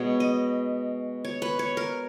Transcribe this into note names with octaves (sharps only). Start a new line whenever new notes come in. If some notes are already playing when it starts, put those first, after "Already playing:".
Already playing: B2 G#3 B3 C#5
D#5
C#5
B4
C#5
A#4